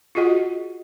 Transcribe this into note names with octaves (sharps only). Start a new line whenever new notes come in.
F4 F#4 G#4 D#5 F#5